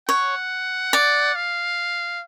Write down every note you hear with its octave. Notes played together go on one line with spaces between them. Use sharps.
C#5 F#5
D5
F5